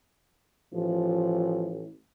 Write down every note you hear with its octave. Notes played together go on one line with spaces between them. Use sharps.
A1 F3